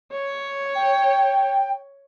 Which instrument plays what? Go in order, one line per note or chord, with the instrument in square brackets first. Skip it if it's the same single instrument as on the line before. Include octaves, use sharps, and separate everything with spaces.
[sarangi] C#5
[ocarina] G5